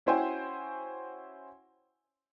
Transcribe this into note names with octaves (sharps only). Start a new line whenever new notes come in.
C#4 E4 F#4 C5 G5 G#5